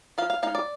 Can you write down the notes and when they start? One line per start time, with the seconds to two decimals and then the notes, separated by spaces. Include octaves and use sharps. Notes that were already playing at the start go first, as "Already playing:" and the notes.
0.18 F3 F5
0.30 F5
0.42 G#3 D#4 F5
0.55 D5